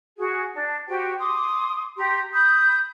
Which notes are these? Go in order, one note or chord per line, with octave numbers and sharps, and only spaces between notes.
F#4 G#4
D4
F#4 G4 C5 G5
C6 D6 D#6
G4 A#5 C6
B5 D#6 G6